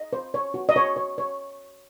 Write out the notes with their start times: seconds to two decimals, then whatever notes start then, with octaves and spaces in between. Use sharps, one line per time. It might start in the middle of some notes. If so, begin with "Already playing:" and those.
Already playing: D#5
0.13 C5
0.34 C#5
0.54 F#4
0.69 D#5
0.76 F#4 C#5
0.96 C#5
1.18 C#5